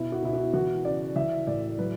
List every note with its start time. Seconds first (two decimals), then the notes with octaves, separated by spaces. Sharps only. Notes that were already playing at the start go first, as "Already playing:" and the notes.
Already playing: B2 B3 E4
0.12 F#4
0.22 B2 E4
0.33 F#4
0.53 E3 F#4
0.85 C#3 D5
1.16 E3 E5
1.47 A2 D5
1.78 F#3 B4